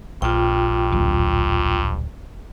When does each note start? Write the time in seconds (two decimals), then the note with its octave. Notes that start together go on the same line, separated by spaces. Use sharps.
0.22 A#1 G2 F4 G5
0.92 D1